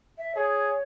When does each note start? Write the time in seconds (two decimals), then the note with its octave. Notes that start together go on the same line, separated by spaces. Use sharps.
0.18 E5
0.35 G#4 C#5